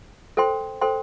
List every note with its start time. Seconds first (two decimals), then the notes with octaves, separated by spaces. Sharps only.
0.37 A4 C5 G5 C6
0.81 A4 C5 G5 C6